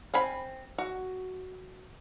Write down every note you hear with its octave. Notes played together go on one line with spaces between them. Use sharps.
C4 G#5 B5
F#4